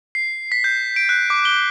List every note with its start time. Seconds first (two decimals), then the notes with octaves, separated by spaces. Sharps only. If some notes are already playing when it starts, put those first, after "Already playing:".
0.15 C7
0.52 B6
0.64 G6
0.96 D7
1.09 F#6
1.30 D6
1.45 G7